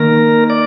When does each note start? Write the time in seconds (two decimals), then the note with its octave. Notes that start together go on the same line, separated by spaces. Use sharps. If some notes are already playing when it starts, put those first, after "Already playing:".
Already playing: D#3 A#3 D#4 A#4
0.50 D5